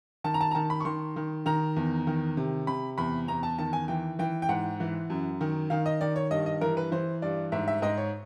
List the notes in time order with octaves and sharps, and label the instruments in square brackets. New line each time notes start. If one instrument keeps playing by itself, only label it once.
[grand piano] D#3 A5
A#5
A5
A#5
D#3 A5
B5
C#6
D#3 C6
D#3
D#3 A#5
E2
D#3
C3
C3 B5
E2 B5
E2 A#5
A5
D#3 A5
G#5
E3 G5
E3 G5
G5
G#2 F#5
E3
F#2
D#3
D#3 F5
D#5
D#3 D5
C#5
G2 D#5
D#5
E3 A#4
B4
E3 C5
G2 D5
G#2 E5
E5
G#2 D#5
C#5